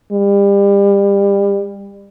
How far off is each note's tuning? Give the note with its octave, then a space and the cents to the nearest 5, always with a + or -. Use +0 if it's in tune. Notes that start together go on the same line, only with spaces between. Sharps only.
G3 +30